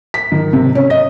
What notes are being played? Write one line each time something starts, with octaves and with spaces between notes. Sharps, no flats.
B6
D#3
C3
C#4
D#5